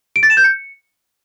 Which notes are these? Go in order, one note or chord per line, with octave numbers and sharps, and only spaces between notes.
D7
A6
E7
G6
C#7